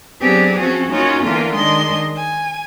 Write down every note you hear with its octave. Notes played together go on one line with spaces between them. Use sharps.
F#3 B3 C4 D4 G4 G#4
F3 C4 C#4 F#4
A#3 C#4 D#4 F4 F#4 C#5
D3 E3 A#3 B3 D4 F4
D#3 G#3 D4 D#5 C6
G#5